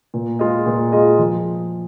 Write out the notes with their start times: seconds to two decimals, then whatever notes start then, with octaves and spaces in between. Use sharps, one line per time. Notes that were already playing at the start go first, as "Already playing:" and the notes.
0.14 A#2
0.39 G#3 F4 G#4 D#5
0.66 A#2
0.92 G#3 F4 G#4 D#5
1.19 F3